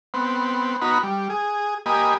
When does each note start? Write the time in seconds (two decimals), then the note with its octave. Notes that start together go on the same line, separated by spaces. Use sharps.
0.14 B3 C4
0.82 B3 D#4 F#4 A#5 B5
1.03 G3
1.30 G#4
1.86 A#3 G4 D#5 G#5 B5